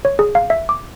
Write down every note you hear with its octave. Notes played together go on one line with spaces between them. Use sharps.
C#5
G#4
F5
E5
D6